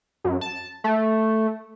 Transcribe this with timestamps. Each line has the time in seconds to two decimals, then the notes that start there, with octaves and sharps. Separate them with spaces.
0.24 F#2
0.41 A5
0.84 A3